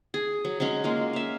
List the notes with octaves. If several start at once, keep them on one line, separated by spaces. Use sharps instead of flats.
G#4
F#3
F#3 G#3 C#4 F#4
G#3 A#3 F4
E5 F5